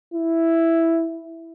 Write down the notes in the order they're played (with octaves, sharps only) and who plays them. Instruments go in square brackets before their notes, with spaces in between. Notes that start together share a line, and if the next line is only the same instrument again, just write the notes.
[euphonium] E4